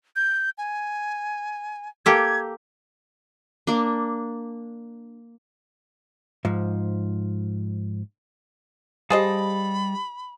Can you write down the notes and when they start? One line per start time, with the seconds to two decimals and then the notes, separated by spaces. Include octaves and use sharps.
0.16 G6
0.58 G#5
2.06 A#3 G4 A4 G#6
3.67 A#3 D4
6.45 G#2 F3
9.10 G3 G4 G#4 C5 D#5 F5 A5 B5